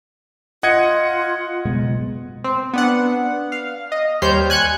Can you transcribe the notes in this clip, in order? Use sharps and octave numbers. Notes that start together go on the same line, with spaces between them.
F4 D#5 F#5 G#6 C#7
F#1 B2 G#3
C4
B3 D4 F#5
F5
D#5
D#2 G3 C5 C#5 F6 G6
G#5 F#6 G#6 C#7